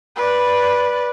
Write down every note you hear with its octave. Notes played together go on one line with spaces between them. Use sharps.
B4 D5